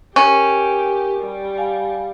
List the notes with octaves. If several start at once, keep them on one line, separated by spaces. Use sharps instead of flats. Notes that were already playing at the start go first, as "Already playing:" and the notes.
C#4 G4 A#4
G3
F5 G#5